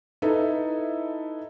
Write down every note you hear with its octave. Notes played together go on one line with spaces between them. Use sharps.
D#4 E4 A4 B4